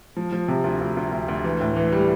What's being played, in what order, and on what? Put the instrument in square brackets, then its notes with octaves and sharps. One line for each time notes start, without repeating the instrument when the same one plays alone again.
[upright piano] F3
F3
C3
D2
D2
D2
D2
D2
E3
A2
E3
G3